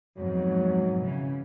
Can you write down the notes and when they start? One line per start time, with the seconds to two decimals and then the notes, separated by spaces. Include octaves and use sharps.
0.17 F2 G#2 B2 F#3
1.01 C#3 E3